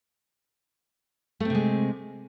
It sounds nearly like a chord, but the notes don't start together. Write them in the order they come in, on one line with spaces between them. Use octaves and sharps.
A3 C4 C3 G#3